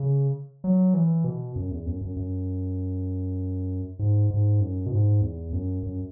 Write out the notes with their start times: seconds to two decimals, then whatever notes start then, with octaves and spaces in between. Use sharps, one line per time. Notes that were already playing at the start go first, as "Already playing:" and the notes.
Already playing: C#3
0.64 F#3
0.94 E3
1.24 B2
1.56 F#2
1.71 E2
1.86 F#2
2.01 F#2
2.16 F#2
3.99 G#2
4.30 G#2
4.61 F#2
4.86 B2
4.91 G#2
5.21 E2
5.52 F#2
5.83 F#2